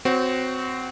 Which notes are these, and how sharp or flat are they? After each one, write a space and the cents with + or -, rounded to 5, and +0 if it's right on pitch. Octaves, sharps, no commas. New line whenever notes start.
C4 -20 F#4 +0 C#5 -30